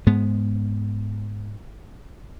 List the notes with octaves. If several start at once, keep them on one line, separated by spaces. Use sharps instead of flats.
G#2 G#3 B3